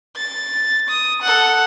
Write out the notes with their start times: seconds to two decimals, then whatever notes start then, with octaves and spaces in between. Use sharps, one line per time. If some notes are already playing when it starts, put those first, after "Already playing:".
0.16 A6
0.89 D#6
1.22 A4 F#5